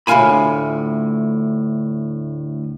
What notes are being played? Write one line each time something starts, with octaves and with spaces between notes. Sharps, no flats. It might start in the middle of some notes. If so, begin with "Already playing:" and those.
D2 A2 G#3 F4 G#5 B5